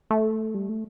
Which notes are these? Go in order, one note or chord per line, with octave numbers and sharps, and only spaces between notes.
A3
G3
A3